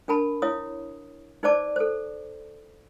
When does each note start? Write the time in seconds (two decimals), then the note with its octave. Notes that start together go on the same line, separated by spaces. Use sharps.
0.08 D4 A#4 A5 B5
0.42 E4 C#5 F5 D#6
1.43 D#4 B4 C5 D5 A5 D6
1.76 A4 C5